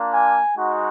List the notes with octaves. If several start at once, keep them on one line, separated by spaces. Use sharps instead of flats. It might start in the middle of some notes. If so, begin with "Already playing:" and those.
Already playing: A#3 D4 F4
G#5
G#3 D#4 F#4